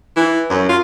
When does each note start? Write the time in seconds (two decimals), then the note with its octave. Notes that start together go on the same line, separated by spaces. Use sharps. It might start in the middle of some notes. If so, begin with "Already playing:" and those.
0.16 E3
0.50 F#2
0.69 F4